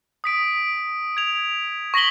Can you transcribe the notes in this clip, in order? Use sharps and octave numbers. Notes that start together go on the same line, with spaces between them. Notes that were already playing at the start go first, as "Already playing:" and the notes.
D#6 B6 D7
G#6 F7
C#6 A#6 B6 F#7 G7